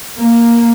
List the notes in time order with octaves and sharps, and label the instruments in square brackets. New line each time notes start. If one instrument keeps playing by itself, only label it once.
[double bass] A#3